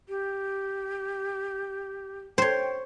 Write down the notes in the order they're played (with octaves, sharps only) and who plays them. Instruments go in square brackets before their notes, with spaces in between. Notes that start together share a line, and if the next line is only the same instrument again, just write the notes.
[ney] G4
[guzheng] C5 C#5 [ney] G5